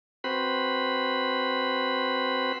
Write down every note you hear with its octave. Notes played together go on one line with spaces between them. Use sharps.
C4 F#4 B4 C5 B5